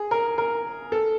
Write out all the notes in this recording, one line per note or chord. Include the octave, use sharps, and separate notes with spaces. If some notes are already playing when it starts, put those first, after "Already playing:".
Already playing: G#4
A#4
A#4
A4